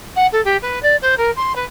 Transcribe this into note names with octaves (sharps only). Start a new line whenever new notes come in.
F#5
A4
G4
B4
D5
C5
A#4
C6
B4